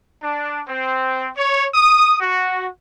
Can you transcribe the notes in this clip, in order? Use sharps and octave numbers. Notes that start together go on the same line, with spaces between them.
D4
C4
C#5
D#6
F#4